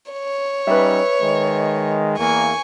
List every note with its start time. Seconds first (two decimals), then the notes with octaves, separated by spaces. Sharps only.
0.11 C#5
0.67 G3 C#4 D#4 B4 E5
1.21 D#3 G#3
2.18 E2 A#3 G#5 C#6